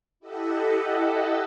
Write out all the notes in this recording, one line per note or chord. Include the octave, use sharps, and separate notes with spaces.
E4 G4 A4 D#5 E5 F#5